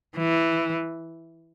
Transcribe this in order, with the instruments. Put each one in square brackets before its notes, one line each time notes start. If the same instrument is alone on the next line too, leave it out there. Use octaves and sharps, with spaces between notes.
[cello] E3